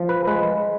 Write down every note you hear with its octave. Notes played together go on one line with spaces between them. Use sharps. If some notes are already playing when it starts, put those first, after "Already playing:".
Already playing: F3
B4
G#3 B4